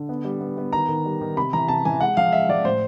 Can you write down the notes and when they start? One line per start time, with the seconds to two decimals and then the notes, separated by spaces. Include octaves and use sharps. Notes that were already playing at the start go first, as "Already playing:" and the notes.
Already playing: D3
0.09 B3
0.25 G3
0.41 B3
0.58 B3
0.73 D#3 A#5
0.89 D#3
1.06 G3
1.21 D#3
1.37 C3 B5
1.53 E3 A#5
1.68 C3 A5
1.85 E3 G#5
2.00 G#3 F#5
2.17 F3 F5
2.32 G#3 E5
2.49 F3 D5
2.65 A2 C5